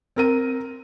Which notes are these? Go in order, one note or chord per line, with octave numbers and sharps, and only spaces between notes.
C4 A#4 D#7